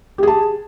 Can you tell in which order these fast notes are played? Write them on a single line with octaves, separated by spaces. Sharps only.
G4 G#4 A5